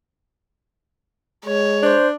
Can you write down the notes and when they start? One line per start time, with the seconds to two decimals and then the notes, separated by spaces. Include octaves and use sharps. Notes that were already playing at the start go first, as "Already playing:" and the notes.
1.46 G#3 C#5
1.83 D4 C5